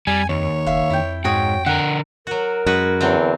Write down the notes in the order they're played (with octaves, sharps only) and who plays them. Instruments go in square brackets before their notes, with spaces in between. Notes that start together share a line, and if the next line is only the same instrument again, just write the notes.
[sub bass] F2 [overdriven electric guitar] G3 [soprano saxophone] G#5
[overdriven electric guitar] D#2 [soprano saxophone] C#5
[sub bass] F#1 [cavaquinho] E5 F5
[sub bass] F2 [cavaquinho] E4 G5
[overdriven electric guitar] G#2 [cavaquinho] F#4 C#5 D#6 [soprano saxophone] G5
[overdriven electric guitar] D3 A#4 [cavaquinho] F#5
[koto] F#3 F#4 [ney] A#4
[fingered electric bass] F#2 [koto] G#3 F#4 B4
[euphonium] E2 [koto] D3 F#3 C4